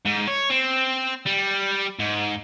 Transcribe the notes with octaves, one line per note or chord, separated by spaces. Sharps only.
G#2
C#5
C4
G3
G#2